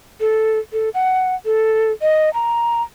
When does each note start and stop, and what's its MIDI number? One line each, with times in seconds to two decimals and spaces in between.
0.20 0.58 69
0.73 0.89 69
0.94 1.35 78
1.45 1.92 69
2.02 2.33 75
2.34 2.82 82